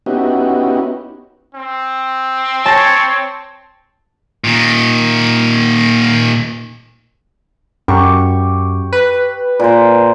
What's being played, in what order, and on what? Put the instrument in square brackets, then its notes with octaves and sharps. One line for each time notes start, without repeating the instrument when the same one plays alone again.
[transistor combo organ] B3 C#4 D#4 E4 F#4 G4
[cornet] C4
[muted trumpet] C#5 [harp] A5 A#6 C#7
[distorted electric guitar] A#2 D#3
[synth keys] F#2 [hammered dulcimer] G4 C#6
[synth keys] B4
[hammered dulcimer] A#2 C5